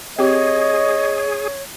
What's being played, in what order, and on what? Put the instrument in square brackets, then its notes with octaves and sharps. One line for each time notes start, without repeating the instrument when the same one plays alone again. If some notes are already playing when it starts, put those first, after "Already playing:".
[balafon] C4 G4 [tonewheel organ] G#4 [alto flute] C#5 [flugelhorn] D#5